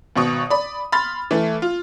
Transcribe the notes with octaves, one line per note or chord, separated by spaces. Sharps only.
G#1 B2 C#6 D#6
D5 B5
B5 C6 F6 A6
E3 A3
F4